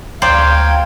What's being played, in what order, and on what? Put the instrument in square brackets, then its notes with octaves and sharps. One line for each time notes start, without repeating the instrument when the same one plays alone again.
[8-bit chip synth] D2 A#5 G#6 [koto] C5 D5 [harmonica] F5 [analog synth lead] G5